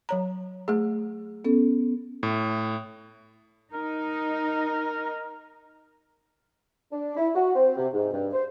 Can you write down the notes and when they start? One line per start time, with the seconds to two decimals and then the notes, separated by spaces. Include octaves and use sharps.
0.09 F#3 C#5 A#5
0.68 A3 G#4
1.45 B3 C#4 A4
2.23 A2
3.73 D#4 A#4
6.91 D4
7.17 E4
7.35 F#4
7.55 C4
7.77 C3
7.93 G#2
8.12 G2
8.33 C5